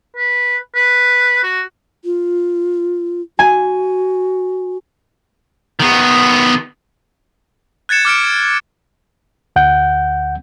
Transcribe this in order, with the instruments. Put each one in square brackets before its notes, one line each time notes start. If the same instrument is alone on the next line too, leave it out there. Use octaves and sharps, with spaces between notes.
[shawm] B4
B4
F#4
[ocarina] F4
[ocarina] F#4 [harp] G#5
[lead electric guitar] D#3 B3
[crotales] F#6 G#6 A6 C#7 E7
D6 F6 C#7 D7
[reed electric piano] D2 F#5 G6